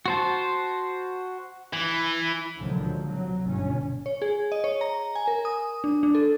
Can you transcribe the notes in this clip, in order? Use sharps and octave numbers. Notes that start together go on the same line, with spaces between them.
F#4 C5 A5
E3
C#2 A#2 D3 D#3 F3 F#3
C3 F#3
G1 B2 C#4
C#5
G#4
D#5
C#5
A#5
G#5
A#4
D#6
D4
D4
A4